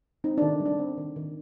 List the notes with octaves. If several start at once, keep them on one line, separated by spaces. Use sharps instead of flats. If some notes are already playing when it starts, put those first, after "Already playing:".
C4 D#4
D#3 D4
G3
D4
C4
D#3
D#3